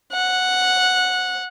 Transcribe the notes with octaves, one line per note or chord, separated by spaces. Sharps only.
F#5